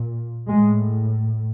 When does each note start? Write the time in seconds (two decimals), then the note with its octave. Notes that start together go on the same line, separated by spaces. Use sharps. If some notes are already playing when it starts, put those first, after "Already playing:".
Already playing: A#2
0.47 A2 G#3